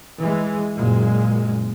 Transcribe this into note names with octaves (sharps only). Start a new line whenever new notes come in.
E3 G#3
F#1 A#2 G#3